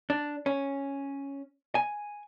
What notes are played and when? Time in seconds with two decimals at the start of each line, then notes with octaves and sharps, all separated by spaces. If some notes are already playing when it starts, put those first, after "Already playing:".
0.10 D4
0.46 C#4
1.75 G#5